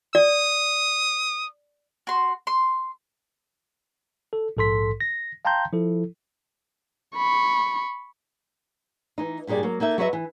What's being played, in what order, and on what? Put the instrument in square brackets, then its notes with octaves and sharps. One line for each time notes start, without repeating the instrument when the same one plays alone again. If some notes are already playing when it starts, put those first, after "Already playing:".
[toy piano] D5 [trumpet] D#6
[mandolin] F#4 C6
C6
[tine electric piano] A4
A#1 G#2 A4 C6 B6
A#6
F5 G5 A5 A#5 C6 G6
F3 E4 A4
[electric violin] B5 C#6
[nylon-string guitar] E3 D#4
G2 A#2 G3 G#4 D5
F#3 A#3
A#3 D#4 A4 E5
F#3 F#4 B4 C5 D#5 E5
E3